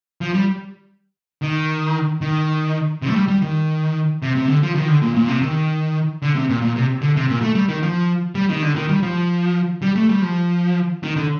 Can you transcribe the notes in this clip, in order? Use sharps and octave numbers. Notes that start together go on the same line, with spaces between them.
F3
G3
D#3
D#3
C3
A3
G3
G3
D#3
C3
C3
D3
F3
D#3
D3
A#2
A#2
C3
D#3
D3
C3
A#2
A#2
C3
D3
C3
A#2
A3
G3
D#3
F3
G3
D#3
D3
D#3
G3
F3
G3
A3
G3
F3
D#3
D3